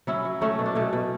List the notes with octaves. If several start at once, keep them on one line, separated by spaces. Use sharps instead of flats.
F#3 C#4 E4
F#3
F#3 A3 C#4
B2
D4
B2 A3 C#4
B2